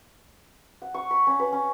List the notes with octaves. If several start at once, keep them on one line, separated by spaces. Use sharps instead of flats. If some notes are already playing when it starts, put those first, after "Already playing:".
F#5
C#6
B5
C#4
B4
C#4